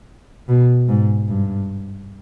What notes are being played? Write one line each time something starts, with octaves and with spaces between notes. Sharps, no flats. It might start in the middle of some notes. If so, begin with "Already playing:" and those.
B2
G#2
G2